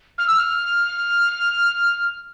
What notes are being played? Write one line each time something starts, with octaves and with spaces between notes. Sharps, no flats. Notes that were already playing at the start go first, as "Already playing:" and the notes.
F6
E6
F6